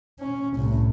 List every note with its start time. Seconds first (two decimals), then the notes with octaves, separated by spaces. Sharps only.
0.20 C#4
0.55 C2 A2